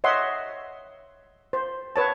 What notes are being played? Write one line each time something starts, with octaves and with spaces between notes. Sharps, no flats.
C#5 D#5 E5 F#5 C6
C5
B4 C#5 A5